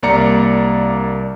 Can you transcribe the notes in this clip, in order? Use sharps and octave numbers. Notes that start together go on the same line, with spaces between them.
C2 A#3 D5 A#5 C#7